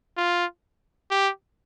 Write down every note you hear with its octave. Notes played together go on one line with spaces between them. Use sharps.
F4
G4